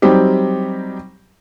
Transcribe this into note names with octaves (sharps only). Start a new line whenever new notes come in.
F#3 G3 C4 D#4 G4